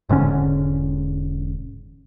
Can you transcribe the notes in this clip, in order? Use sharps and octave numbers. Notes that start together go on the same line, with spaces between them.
E1 G#2 D3 C#4